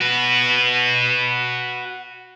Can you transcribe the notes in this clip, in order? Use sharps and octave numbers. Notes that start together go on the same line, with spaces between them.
F#4 B4